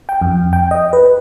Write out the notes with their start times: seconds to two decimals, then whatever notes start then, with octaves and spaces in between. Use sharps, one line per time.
0.09 G5
0.21 F2
0.53 G5
0.71 D#5
0.93 B4